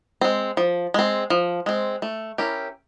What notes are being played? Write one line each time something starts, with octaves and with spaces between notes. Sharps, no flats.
G#3 C4
F3
G#3 C4
F3
G#3 C4
A3
C#4 E4 G4 A#4